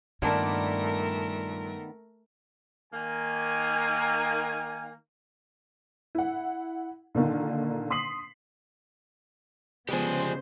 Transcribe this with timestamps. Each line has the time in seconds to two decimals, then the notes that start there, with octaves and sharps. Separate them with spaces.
0.22 G2 A#2 D#3 A3 B3 D4 A#4 D5
2.93 D#3 A#3 G#5
6.15 E4 F#5
7.15 A#2 D3 D#3 A#3
7.90 C6 D#6 B6 C7 F#7
9.89 C#3 F3 G#3 B3 G4 C5 D5 G#5